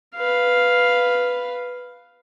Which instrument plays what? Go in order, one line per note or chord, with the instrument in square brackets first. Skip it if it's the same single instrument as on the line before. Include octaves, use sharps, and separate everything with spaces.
[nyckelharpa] B4 F5